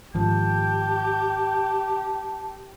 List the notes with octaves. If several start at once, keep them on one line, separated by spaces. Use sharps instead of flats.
G#1 F3 G4 A5 G6